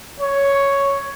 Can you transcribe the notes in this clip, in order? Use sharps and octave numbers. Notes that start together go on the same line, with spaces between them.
C#5